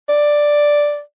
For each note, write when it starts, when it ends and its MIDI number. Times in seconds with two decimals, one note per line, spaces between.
0.09 1.00 74